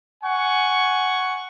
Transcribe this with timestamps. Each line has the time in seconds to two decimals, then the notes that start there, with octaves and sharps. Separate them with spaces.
0.24 F#5 G#5 C#6